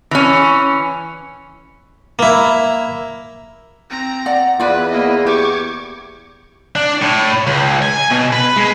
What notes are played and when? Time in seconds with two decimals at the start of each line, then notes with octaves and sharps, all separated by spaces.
0.11 E3 C#4
2.19 A#3 E4
3.90 C4 A#5
4.26 D5 F#5
4.60 E2 B3 E4 F4 B4 D5
4.90 A#3 D#5
5.27 G4 C#6 D6 G#6
6.76 D4
7.02 A2
7.47 C#2
7.82 G#5
8.11 B2
8.32 B4
8.56 G#3